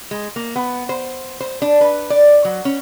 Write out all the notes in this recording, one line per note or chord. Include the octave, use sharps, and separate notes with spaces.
G#3
A#3
B3
C5
C5
D4
B4
D5
F#3
C#4